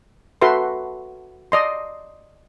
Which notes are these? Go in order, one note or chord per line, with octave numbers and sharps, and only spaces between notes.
F#4 A4 B4 E5 C6
D5 D#5 C6